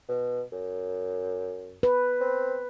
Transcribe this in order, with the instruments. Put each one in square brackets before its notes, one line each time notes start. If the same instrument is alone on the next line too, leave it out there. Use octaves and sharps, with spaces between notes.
[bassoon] B2
F#2
[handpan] B4
[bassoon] C4